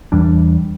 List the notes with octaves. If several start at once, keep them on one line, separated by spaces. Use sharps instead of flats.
E2 E3 G3 D4